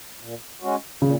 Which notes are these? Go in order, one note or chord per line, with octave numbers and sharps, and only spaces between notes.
A#2
G#3 C#4 F#4
A#2 C#3